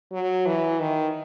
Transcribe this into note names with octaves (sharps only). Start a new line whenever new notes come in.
F#3
E3
D#3